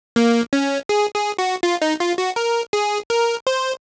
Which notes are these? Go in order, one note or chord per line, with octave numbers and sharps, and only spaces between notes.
A#3
C#4
G#4
G#4
F#4
F4
D#4
F4
F#4
A#4
G#4
A#4
C5